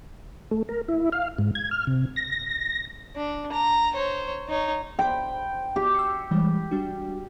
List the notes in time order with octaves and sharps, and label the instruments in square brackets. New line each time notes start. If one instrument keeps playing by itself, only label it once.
[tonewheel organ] A3
A#4
E4
F5
G#2
G#6
F6
C3
A#6
[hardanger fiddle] D4
A#5
C5 C#5
D#4 C#5
[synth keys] C5 B5 C6 [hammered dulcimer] G5
[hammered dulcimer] G4
[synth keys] E6 C7 C#7
E3 G3 G#3
G3 D4 F#4